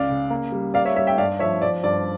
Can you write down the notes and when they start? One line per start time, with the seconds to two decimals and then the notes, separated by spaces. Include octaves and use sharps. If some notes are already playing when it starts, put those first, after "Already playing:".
Already playing: C#2 D5 F5
0.09 C#3
0.30 A#3
0.52 G3
0.74 A#3 D5 F5
0.85 C#5 E5
0.96 G3 C#5 E5
1.07 E5 G5
1.18 G2 D5 F5
1.39 F3 C#5 E5
1.62 F3 D5
1.83 G2 D5